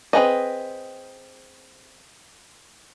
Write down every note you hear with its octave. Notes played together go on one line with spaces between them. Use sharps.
C4 E4 G#4 B4 D#5